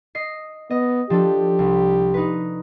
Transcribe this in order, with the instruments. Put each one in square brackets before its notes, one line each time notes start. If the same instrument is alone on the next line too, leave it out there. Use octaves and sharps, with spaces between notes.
[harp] D#5 C7
[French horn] B3 [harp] D#5
[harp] F3 D4 A4 [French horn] G4
[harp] C2
D#4 B4